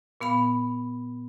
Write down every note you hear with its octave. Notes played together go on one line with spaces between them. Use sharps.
A#2 B3 F5 B5